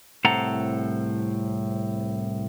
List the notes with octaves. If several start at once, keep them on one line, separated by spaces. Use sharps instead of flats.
C2 A2 C4 A4 F#5 A#5